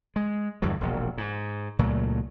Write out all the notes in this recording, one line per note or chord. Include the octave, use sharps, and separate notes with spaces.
G#3
E2 G2 D3 F#3
E1 A#1
G#2
C#2 A#2 F#3 A3